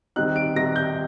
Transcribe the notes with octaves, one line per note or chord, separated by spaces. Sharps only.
D#3 G3 C4 D#4 F#6
D7
D#3 G3 C4 D#4 A#6
G6